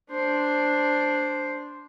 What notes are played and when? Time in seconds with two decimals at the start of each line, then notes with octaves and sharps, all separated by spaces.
0.10 D4 C5